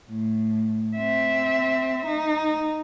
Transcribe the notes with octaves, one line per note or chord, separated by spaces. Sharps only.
A2
C4 E5
D#4